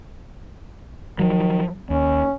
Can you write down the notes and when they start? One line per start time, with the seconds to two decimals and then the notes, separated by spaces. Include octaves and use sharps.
1.19 D#3 F3 F#3
1.90 D#2 C#4